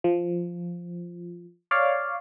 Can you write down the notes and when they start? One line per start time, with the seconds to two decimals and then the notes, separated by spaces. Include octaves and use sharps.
0.04 F3
1.71 C#5 D5 F5